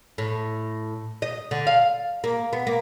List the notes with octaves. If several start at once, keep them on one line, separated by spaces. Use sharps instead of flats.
A2
D#5
D3
F5
A#3
B3
A#3